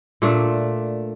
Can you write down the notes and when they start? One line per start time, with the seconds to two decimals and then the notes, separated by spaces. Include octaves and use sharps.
0.22 A#2 A3 D4